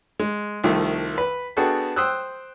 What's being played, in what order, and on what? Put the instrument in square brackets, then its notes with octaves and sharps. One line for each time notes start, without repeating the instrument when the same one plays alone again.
[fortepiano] G#3
C2 D#3 F3 A3
B4
B3 D4 F#4 G#4 A4 G5
C5 G5 D#6 E6 F#6